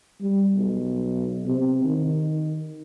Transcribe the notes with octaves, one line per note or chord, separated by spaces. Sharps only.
G3
B1
C3
D#3